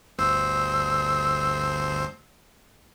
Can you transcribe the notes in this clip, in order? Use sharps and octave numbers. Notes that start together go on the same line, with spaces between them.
G1 D2 C5 E6